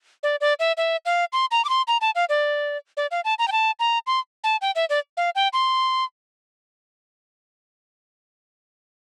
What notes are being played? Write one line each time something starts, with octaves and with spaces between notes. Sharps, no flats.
D5
D5
E5
E5
F5
C6
A#5
D6
C6
A#5
A5
F5
D5
D5
F5
A5
A#5
G5
A5
A#5
C6
A5
G5
E5
D5
F5
G5
C6